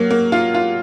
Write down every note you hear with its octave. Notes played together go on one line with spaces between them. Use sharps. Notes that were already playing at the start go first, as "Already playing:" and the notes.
Already playing: F#3 A#3
A#3
F4
F4